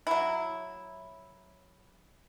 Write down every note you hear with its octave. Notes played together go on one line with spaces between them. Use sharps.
F#3 E4